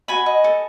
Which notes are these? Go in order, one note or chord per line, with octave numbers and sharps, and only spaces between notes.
F#4 G#5 B5
D#5
A4